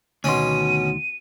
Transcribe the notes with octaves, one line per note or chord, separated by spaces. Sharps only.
D2 B2 D#3 C#4 C6 D#7